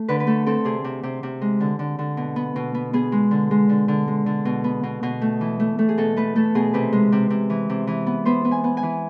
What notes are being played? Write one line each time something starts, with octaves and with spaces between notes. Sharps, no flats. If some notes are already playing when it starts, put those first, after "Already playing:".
Already playing: A3
D3 B4
B4
A3 A4
C4 A4
C3 G#4
C3
C3
C3
G#3
D3
D3
D3
B2
B3
B2
B3
B3 G#4
G#3
D3
G#3
D3
D3
G#3
D3
B2
B3
B2
B2
A3
E3
A3
A3
G#4
B2 A4
A3 B4
A3 A4
B2 G#4
C3 B4
G#3
C3
C3
E3
C3
E3
B3
B3 C5
B3
G#5
B3
G#5
E3